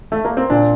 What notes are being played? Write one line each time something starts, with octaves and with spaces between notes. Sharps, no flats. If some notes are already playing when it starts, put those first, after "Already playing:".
A3
A#3
C4
A#2 D4